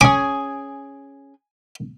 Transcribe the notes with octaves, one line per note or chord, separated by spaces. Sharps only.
C#4 G#4 G#5 D6